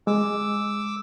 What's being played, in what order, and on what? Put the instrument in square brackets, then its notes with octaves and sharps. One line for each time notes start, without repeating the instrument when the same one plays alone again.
[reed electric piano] G#3 [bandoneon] D6 E6